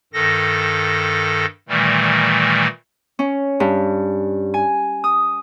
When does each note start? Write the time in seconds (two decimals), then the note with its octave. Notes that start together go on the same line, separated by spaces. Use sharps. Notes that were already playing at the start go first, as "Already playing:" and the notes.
0.13 G2 D#3 A4 A#6
1.69 A#2 D#3 E3 G3 A3
3.19 C#4
3.60 G2
4.54 G#5
5.04 D#6